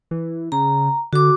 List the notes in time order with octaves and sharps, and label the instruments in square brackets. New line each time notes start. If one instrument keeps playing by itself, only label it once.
[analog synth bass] E3
[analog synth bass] C#3 [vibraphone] A#5
[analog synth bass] D3 [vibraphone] F#4 D6